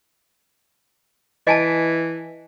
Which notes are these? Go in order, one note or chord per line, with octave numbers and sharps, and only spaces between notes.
E3 D#5 G#5 A5